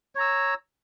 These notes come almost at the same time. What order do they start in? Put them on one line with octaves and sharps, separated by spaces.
C#5 A#5 E6